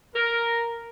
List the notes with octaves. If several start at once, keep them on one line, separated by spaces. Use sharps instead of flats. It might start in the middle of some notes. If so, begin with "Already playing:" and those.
A#4